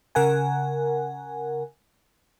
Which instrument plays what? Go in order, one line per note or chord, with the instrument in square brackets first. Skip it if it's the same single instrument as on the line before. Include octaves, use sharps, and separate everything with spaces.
[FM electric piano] C#3 A#4 F#5 G#5